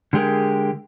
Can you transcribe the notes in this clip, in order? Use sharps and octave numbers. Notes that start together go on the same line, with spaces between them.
D3 G#3 G4 G#4 A#4